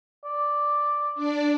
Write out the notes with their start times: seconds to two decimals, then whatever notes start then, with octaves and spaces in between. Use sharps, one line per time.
0.24 D5
1.15 D4 D5